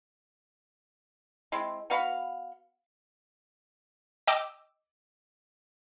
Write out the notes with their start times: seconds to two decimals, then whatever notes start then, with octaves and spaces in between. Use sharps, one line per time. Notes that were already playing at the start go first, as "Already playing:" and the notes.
1.52 G#3 C4 E4
1.90 B3 F#4 F5 B5
4.27 D#5 G5 D6 E6